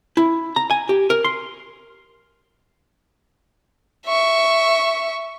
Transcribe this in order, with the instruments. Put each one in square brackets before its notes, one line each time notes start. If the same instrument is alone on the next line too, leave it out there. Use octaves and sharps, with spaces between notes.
[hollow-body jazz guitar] E4
A#5
G#5
G4
A#4
C6
[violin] E5 C#6